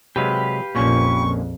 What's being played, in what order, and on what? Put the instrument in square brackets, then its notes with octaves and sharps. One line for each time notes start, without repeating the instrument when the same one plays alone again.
[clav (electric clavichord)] C3 F#3 G#3 [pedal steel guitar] G4 B4 F5
[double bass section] A#1 F2 [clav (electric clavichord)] A#2 A#3 C#4 [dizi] C#6